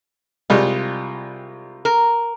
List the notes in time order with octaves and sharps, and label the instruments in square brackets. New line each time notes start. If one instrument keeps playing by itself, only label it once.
[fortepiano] C2 G3 G#3 [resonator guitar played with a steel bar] F4
[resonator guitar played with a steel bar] A#4